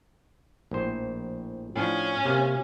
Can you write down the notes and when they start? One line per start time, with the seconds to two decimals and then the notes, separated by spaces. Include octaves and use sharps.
0.71 A#1 A2 C5
1.76 A2 F3 C#4 D4
2.25 C3 A#3